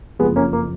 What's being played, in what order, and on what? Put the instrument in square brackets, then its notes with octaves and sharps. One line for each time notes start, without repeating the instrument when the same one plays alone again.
[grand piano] F#1 F2 F3 G#3 B3
A#3 C#4
A#3